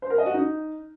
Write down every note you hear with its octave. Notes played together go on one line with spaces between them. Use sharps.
C5
A#4
D#5
F#4
D#4